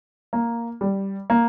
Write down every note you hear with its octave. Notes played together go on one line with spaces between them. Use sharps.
A#3
G3
A#3